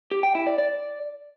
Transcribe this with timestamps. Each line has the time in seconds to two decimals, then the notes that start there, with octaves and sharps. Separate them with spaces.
0.11 G4
0.23 G5
0.35 E4
0.47 D5
0.58 D5